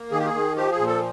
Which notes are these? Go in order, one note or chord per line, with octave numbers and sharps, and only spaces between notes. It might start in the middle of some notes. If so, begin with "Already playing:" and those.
Already playing: A#3
D#3 G#4
G4
G#4
D#3
F3 G4
G#4
A#2
A4